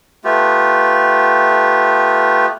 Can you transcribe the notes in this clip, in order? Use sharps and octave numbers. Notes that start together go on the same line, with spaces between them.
A3 B3 F4 G4